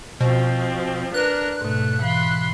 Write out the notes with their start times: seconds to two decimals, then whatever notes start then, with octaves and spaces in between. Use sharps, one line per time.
0.20 B2 F3 C4 C5
1.14 D4 A#4 B4 F#6
1.61 G#2 B2 A3
2.02 E3 F5 B5 C6